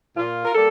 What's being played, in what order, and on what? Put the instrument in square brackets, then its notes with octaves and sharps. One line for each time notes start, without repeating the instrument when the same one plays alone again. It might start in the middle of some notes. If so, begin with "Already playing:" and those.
[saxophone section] A#2 F4
A#4
G3 A#3 A4